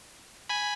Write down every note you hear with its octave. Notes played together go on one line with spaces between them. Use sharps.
G#5 B5